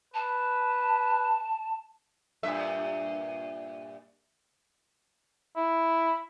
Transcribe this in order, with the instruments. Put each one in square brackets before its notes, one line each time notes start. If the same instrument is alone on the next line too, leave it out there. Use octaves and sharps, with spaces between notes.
[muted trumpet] B4 [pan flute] A5
[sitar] G2 A#2 E5
[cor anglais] E4